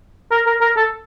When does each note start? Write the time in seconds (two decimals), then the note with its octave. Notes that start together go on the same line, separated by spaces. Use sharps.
0.31 A#4
0.46 A#4
0.61 A#4
0.76 A4